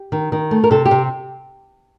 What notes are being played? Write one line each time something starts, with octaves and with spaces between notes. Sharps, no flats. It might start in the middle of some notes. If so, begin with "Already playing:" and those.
Already playing: G4
D#3
D#3
A3
A#4
C3 A4
G4
C3